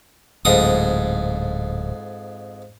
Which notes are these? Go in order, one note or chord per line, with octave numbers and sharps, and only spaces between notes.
D1 F2 G#2 D#6